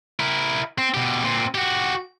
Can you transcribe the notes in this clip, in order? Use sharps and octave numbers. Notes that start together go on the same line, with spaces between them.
E4 A#4
C4
B2 G4
A#2 C4
F#4 G4